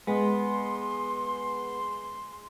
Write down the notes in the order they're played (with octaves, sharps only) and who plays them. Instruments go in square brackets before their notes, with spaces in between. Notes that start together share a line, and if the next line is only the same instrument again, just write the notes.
[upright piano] G#3 [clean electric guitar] B3 [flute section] C6